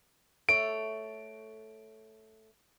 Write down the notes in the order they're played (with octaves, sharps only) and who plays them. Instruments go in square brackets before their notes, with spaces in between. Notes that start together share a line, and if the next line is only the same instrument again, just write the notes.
[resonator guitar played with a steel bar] A3 C#5 [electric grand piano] D7